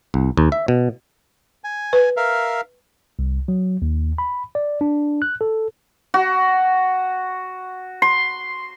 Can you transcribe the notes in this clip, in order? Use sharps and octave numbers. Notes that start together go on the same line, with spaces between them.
C2
D#2
E5
B2
G#5
B4
A#4 E5 F5
C2
F#3
D#2
B5
D5
D4
F#6
A4
F#4
C6